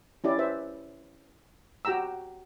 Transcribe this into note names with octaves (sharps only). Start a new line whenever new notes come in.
C#4 E4 G4 D5
B4 C5 E5
F#4 G4 G5 A#5 E6